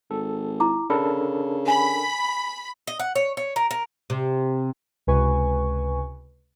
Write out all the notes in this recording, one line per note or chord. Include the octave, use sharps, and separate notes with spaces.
G#1 A4
E4 A#5 D6
C#3 D4 A4 A#4 B5
G#5 B5
D#5
F#5
C#5
C#5
A#4
A#4
C3
C#2 C3 B4 G#5 C#6